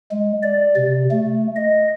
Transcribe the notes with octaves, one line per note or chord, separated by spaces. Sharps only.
G#3
D5
C3
A3
D#5